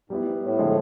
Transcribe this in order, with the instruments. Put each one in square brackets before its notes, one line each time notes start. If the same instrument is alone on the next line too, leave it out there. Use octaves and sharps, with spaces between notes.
[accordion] G#2 [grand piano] G3 B3 E4
[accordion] G#2
A2
[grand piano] D3 F3 G#3